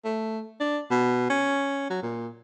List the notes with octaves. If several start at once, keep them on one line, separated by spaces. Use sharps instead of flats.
A3
D4
B2
C#4
F#3
A#2